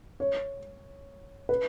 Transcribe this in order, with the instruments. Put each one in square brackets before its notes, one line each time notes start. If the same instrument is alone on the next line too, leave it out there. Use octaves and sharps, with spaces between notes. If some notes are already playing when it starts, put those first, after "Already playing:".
[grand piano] C#5
B4